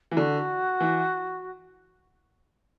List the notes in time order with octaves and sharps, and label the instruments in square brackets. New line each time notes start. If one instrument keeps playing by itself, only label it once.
[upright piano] E3
[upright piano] D3 [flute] F#4
[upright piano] E3